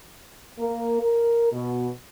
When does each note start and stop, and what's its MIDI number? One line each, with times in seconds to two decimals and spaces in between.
0.60 0.97 58
1.02 1.48 70
1.53 1.89 47